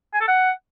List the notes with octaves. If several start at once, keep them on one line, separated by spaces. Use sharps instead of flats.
G#5
A4
F#5